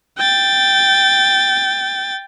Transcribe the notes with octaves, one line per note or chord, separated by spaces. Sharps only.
G5 A6